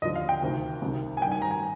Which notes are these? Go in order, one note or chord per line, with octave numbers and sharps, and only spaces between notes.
D#2 D3 F3 D#5
F5
G5
D2 C3 D#3
C2 C3 D#3
G#5
G2 D#3 G5
G#5
A#5
G#5